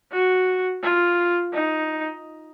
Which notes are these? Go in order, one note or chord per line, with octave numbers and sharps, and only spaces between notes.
F#4
F4
D#4